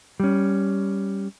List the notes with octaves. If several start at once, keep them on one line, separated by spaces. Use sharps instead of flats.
G3 C#4